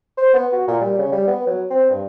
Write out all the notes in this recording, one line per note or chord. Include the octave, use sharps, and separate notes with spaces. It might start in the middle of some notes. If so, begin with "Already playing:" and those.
C5
B3
F#4
A#2
G3
C#3
G3
B3
F#3
C4
G2